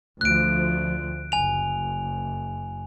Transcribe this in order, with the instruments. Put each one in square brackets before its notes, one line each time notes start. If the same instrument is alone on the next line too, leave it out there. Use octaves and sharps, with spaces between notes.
[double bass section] D2 F3 [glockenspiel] F#6 D7
[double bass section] F#1 [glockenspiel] G#5 F7